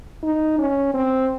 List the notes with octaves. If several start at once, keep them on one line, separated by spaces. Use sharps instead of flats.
D#4
C#4
C4